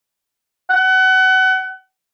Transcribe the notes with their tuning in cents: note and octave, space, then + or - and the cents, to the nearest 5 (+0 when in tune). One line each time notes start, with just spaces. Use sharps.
F#5 +30